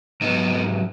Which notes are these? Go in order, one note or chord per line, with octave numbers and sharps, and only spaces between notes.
G#2 F#3 B3 D#4